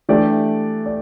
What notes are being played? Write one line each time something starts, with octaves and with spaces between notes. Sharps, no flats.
E3 A3 D4 G4 D5
D5